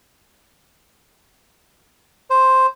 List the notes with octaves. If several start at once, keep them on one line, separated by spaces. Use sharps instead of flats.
C5